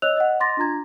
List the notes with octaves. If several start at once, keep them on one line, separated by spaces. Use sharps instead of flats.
C#5 D#5 E6 F#6 F7
D#5 F#5
C6 D6 A6 A#6
D4 F4 A#5 G#6